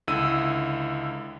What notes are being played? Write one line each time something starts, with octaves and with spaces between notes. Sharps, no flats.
C#2 D3 E4 E6 D#7